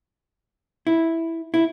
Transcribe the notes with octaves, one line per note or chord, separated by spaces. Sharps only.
E4
E4